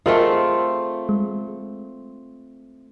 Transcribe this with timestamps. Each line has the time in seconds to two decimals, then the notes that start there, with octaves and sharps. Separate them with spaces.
0.06 A3 C4 F4 G#4 A#4 D#5
1.09 G#3